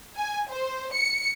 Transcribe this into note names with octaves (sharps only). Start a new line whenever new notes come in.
G#5
C5
C#7